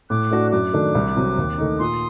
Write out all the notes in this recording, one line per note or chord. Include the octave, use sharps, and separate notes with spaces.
A2 D6 F#6
A3 D4 F#4
F#2 D6 F#6
D#3 A3 D4
C2
C3 F#3
D#2
D#3 A3 D#4
A#2 C6 D#6